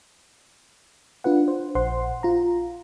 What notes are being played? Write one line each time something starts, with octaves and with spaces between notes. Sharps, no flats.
D4 F4 B4 F#5
C5
A#1 C5 F#5 C6
F4 A#5